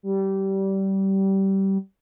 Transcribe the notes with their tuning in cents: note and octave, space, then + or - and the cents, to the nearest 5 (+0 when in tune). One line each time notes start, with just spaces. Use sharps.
G3 -20